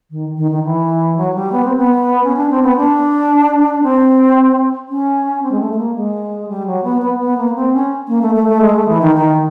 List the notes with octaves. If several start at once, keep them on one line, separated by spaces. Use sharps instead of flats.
D#3
D#3
D#3
E3
F#3
G3
B3
C4
B3
C#4
D4
C4
B3
D4
C4
C#4
C4
G#3
A3
A3
A#3
G#3
G3
F#3
B3
B3
B3
A#3
C4
C#4
A#3
A3
A3
A3
G#3
A3
E3
D#3
D#3